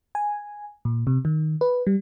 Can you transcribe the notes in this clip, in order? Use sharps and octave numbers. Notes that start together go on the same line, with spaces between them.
G#5
A#2
C3
D#3
B4
G3